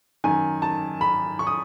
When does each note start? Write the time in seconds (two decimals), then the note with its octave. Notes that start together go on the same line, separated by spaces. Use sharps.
0.24 F#2 D#3 G#5
0.62 A5
1.01 B5
1.39 C#6
1.47 D#6